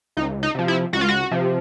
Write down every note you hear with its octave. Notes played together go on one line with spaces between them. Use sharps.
C#2 D#4
D#4
C3 F3
E4
C#2 F#4
F4
F#4
C3 F3